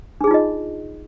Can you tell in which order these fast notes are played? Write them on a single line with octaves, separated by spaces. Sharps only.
D4 G#4 D#4 F4 D#5